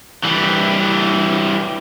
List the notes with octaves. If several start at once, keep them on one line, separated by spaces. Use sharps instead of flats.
E3 G3